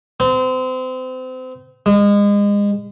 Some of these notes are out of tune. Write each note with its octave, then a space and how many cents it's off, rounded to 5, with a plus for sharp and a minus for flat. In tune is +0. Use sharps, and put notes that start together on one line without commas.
C4 -30
G#3 -30